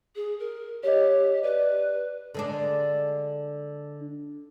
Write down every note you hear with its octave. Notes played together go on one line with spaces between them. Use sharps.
G#4
A#4
G4 C#5 D#5
B4 D5
D3 G#3 D4